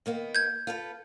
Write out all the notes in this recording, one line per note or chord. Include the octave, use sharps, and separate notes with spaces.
D#3 A#3 B3
G6 G#6
F4 A4 B4